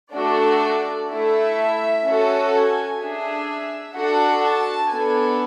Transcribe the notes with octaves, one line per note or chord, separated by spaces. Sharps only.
A3 D4 F#4 A4 D5
A3 E4 A4 E5
C#4 F#4 A4
G#5
D4 G#4 E5
D4 F#4 A4 F#5
A5
B3 D4 A4 G#5